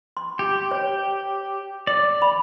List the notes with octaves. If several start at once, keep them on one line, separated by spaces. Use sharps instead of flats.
C6
G4
C#5
D5
B5